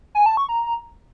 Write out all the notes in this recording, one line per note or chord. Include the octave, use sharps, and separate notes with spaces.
G#5
A5
C#6
A#5